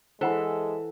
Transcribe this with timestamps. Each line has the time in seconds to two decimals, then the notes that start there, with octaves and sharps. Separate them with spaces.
0.21 E3 G#3 A4 C5 E5 F#5 B5